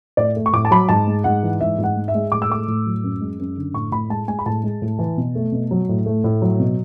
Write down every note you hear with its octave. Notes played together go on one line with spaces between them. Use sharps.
A2 D5
A3
C#6
A2 D6
A5
F#3 B5
G#2 A5
G#3
G#2 F#5
E3
G#2 E5
G#2
F#5
G#3
E5
G#3
A2 D6
E6
A3 D6
A2
F#3
F#2
G#3
F#2
D3
A2 C#6
A2 B5
G#3 A5
G#3 G#5
B5
A2 A5
G#3
A2
E3
B2
A3
B2
F#3
A2
A3
A2
F#3
B2